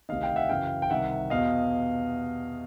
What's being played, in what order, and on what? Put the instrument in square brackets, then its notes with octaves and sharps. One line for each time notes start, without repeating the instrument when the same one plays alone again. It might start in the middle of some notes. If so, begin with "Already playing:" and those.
[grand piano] D2 C3 D#3 D#5 F5
F5 G5
E5 F#5
F#2 C#3 E3 F5 G5
G5
C2 C3 D#3 E5 F#5
E2 B2 D#5 F5